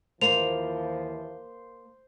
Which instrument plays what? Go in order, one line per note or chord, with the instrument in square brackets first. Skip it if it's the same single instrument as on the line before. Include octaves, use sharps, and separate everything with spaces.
[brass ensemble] D#2 E3 F3 [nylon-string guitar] A#3 [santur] C5 [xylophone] F7